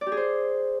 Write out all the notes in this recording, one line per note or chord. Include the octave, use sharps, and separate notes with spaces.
D5
G4
G#4
C5